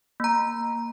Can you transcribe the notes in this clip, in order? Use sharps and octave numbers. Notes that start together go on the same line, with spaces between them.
A#3 A#5